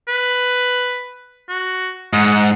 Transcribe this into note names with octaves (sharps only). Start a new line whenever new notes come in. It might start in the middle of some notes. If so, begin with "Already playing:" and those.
B4
F#4
G#2 F#5